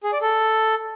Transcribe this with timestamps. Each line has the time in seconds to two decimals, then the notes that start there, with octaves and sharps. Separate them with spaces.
0.04 G#4
0.13 D5
0.22 A4